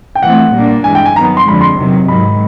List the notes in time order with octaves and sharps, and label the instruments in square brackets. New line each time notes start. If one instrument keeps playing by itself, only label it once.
[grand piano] G5
[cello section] E3 A3 C4 [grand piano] F#5
[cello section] A#2 G3 A#3 D4
[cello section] G2 E3 G#3 [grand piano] G#5
[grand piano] G5
G#5
[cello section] D#3 F#3 B3 [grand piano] A#5
[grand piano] C6
[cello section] F2 D3 F3 G#3 [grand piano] B5
[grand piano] C6
[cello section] E2 C3 D#3 F#3
[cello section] G#2 D#3 F#3 [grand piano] B5